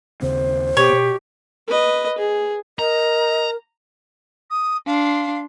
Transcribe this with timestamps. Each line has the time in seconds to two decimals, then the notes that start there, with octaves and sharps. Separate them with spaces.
0.22 D#2 C#3 C4 C5
0.77 B2 B3 G4 C#5
0.93 B2
1.67 B4 D#5
2.18 G#4
2.79 A#4 D#5 A#5
4.51 D#6
4.87 D4 F5 C6